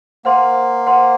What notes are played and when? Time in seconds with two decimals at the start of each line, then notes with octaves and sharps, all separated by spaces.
0.25 A#3 C5 F#5 C6
0.87 C5 F#5 C6